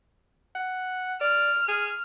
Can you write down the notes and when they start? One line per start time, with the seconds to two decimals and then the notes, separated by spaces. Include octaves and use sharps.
0.55 F#5
1.21 D5 F6
1.68 G#4